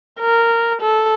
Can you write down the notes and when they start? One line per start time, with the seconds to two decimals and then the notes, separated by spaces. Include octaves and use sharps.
0.20 A#4
0.81 A4